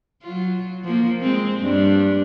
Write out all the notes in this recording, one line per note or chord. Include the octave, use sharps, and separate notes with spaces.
F#3 F4
F3 A#3
G#3 C4
G2 D4